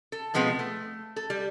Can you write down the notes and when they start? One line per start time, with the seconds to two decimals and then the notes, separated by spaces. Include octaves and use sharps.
0.12 A4
0.34 B2 F3 G#3 B3 C4
0.59 A3
1.16 A4
1.30 G3